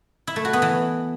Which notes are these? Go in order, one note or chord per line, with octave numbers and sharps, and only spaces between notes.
E4
A3
F#4
B3
E3